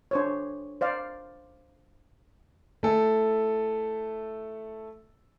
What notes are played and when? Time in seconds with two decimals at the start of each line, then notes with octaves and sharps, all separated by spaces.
0.11 D4 C5 C#5
0.81 C5 D5 F5
2.83 A3 E4 A4